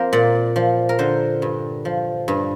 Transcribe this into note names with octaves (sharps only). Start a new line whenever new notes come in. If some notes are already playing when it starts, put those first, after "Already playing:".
Already playing: F3 A#3 C4 A#4 C5
A#2 D5
F3
A#4
D3 C5
G2
F3
G2